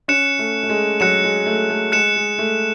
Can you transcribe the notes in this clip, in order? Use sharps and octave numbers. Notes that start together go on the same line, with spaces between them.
C#4 F#6 C#7 E7
A3
A3
G#3
F#3 F#6 C#7 E7
G#3
A3
A3
G#3 F#6 C#7 E7
G#3
A3